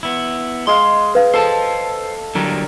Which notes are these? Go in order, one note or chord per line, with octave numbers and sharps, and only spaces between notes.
B3 E4
G#3 G#4 F5 C6
B4 F5
A4 C5 A5
D3 F#3 G3 A#4